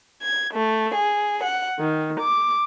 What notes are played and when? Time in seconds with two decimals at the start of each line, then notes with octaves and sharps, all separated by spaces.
0.23 G#6
0.53 A3
0.95 G#4
1.44 F#5
1.79 D#3
2.20 D6